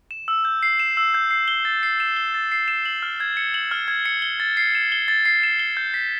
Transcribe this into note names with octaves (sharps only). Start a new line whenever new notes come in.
E7
E6
G6
C7
E7
E6
G6
C7
G7
A6
C7
E7
G7
A6
C7
E7
F#7
F6
G#6
C#7
F#7
F6
G#6
C#7
G7
A6
C7
E7
G7
A6
C7
E7
G7
G6
B6